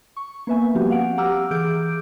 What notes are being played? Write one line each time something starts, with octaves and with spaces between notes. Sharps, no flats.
C#6
A#3 B3 B4 E5 G#5
F3 G3 A#3 C4 F#4 G4
F5 F#5 D7
G4 F#5 A#5 D6 E6 F6
E3 G#4 D6 G6 D7